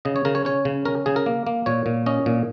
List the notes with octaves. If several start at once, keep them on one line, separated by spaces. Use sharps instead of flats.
C#3 D#5
C#5
C#3 A#4
C#5
C#4 C#5
C#3
C#4 A#4
C#3 G#4
A#4
A#3
A#3
A#2 C#5
A#2
C#4 D#5
A#2